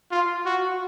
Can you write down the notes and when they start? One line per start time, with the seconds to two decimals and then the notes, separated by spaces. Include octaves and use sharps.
0.11 F4
0.46 F#4